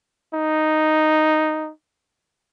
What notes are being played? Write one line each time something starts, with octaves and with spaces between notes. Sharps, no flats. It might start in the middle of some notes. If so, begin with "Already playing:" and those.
D#4